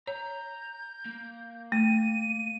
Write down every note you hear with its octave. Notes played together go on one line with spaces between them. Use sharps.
C#5 A#5 G6
A#3
A3 D#7